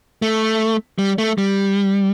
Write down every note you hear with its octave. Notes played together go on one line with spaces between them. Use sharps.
A3
G3
A3
G3